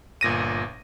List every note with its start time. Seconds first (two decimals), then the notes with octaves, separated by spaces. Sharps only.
0.21 G1 A#2 A#6 D#7